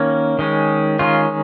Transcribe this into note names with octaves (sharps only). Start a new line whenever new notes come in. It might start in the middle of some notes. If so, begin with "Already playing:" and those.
Already playing: D#3 A#3 C#4
D#3 G#3 C#4
D#3 G#3 C#4 F4